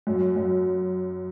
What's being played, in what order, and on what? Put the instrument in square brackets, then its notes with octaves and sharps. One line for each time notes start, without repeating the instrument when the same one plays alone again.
[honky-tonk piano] F#2
F#2